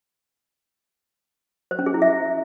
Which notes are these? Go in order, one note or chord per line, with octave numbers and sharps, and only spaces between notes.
C5
C#4
G#4
E4
E5